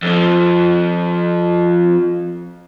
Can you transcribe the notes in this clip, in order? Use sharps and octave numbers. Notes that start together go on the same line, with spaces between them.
F2 F3